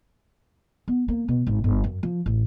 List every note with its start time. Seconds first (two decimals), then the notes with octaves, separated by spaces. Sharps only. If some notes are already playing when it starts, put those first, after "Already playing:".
0.88 B3
1.08 A#3
1.28 B2
1.47 G#1
1.64 G1
1.84 F#2
2.03 F3
2.26 A1